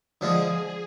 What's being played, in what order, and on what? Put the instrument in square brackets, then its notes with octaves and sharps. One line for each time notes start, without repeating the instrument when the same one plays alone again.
[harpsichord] D3 F3 G#3 [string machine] G#4